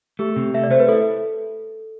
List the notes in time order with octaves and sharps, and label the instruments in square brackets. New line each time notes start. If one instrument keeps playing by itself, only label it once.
[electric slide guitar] A3 [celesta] G4
[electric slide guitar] C3
[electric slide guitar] A3 [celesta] E5
[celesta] D5
[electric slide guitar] A3 [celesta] C5
[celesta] B4
[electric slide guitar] E4 [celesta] A4